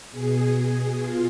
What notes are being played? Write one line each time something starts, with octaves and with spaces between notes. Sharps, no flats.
B2 G#4
G#4
F4